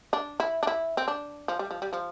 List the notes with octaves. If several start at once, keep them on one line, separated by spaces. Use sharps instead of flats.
D4
E4
D4
E4
C4
D4
F3
G3
F3
G3
F3